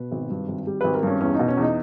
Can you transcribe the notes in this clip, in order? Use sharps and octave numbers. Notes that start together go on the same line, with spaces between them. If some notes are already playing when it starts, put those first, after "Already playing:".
Already playing: B2 B4
G#1
G2
G#1
G3
G#1 B4
A#4
G2 C#4
E2 C#4
B2 D#4
C#4
E2 D#4